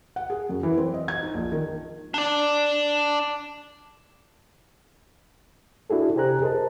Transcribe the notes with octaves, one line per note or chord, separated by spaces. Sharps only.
F#5
G#4
F#2
E3
C4
D#5
G#6
D#4
A#1
D#3
D4 D5
D4 E4 F#4 G#4 A4
C3 G4 C5 G#5 A#5 F#6
G#4 A#4 C5 D#5 A5